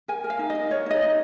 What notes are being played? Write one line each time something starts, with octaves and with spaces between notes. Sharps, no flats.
A#4 G#5
A#4
F5
D#4
D#5
D#4
A#4 C#5
D#4 D#5
D#4